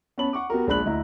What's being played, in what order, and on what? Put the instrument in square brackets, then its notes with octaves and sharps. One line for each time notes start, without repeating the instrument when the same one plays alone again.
[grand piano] B3 C#4 C#5 A5 B5 F#7
F#5 C#6 D6
B3 F#4 G4 A#4
A#1 G#3 D4 B5 F#6 F#7
D2 E4 D#5 A#5